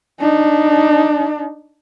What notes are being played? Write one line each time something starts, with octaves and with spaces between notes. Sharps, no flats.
D4 D#4